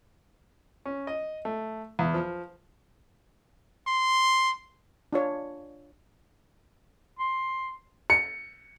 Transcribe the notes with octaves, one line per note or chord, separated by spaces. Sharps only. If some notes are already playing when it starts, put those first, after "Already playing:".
C#4
D#5
A3
E2
F3
C6
D4 F4 C#5
C6
C#7